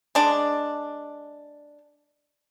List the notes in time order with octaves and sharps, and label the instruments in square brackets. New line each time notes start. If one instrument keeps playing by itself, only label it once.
[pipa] G#3 D4